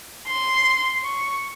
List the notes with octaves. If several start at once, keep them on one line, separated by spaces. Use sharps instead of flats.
C6
C#6